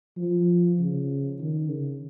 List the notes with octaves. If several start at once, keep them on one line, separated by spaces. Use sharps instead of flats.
F3
C#3
D#3
C#3